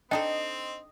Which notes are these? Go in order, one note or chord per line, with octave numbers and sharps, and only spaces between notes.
C4 D4 D#4 A4 D#5 G5 A5